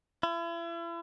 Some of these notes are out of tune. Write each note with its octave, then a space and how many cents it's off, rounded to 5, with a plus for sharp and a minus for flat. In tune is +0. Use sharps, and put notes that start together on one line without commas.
E4 +40